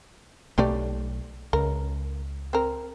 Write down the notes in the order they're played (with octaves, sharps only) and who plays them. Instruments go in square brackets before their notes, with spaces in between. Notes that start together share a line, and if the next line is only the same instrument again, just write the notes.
[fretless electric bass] B1 B2 A3 [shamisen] G3 G4 D5
[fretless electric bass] C#2 [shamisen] A#4
[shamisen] C4 A#4